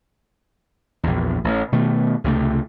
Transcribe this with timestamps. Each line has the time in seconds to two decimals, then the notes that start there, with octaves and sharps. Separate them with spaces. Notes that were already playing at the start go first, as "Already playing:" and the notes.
1.03 A#1 E2
1.44 A1
1.72 B2 D#3 A3
2.24 C#2 C3 F3 A3